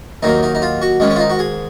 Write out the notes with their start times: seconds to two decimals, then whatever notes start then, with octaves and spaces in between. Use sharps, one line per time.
0.23 D#2 D#3 F#3 A#3 D#4
0.43 D#4
0.55 D#4
0.62 F4
0.82 F#4
1.00 G#2 D#3 G#3 C#4
1.10 C#4
1.16 F4
1.20 D#4
1.30 F#4
1.39 G#4